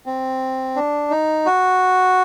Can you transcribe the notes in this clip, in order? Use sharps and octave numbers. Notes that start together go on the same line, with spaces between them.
C4
D4
D#4
F#4